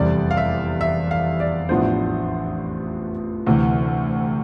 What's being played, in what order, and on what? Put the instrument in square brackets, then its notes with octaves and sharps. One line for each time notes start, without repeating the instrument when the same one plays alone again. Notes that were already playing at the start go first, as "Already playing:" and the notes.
Already playing: [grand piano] F1 E2 C3 G3 D5
F5
E5
E5
F5
D5
A1 A2 F3 B3 D4 C5
D2 C3 E3